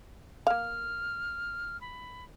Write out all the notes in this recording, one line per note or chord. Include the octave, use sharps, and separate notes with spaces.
A#3 F5 F6
B5